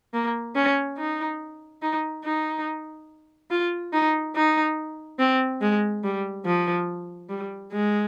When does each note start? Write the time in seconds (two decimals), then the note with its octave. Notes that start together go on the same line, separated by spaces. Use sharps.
0.14 A#3
0.56 C#4
0.98 D#4
1.82 D#4
2.24 D#4
3.51 F4
3.93 D#4
4.35 D#4
5.19 C4
5.61 G#3
6.04 G3
6.45 F3
7.29 G3
7.72 G#3